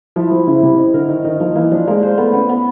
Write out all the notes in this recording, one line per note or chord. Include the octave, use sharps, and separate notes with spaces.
F3 E4
F3 C4
C#3 E4
C3 C4
D#4
D3 A#4
D#3 D#4
D#3 D#4
F3 A#3
E3 A#3
F3 D4
G#3 A#3
G#3 C5
A3 B3
B3 C#4
B3